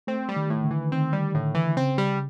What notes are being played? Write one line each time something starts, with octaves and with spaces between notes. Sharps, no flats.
A3 C4
G3
D#3
A2
D3
E3
D#3 C4
G3
A2 D3
E3
C#3 C4
G3